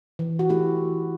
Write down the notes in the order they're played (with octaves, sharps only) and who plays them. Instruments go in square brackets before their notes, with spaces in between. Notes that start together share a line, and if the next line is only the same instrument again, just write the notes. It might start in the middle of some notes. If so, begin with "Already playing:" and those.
[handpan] E3
F#4
A3 E4 G4